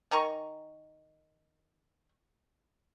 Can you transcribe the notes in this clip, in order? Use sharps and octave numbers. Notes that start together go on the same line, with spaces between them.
D#3 G#5 A#5 C#6